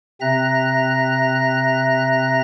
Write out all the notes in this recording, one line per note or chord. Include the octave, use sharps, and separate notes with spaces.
C3 C4 E5 A#5 F#6 A#6